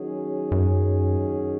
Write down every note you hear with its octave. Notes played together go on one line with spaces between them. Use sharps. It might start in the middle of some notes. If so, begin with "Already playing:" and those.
Already playing: D#3 F#3 C#4 G#4
F#2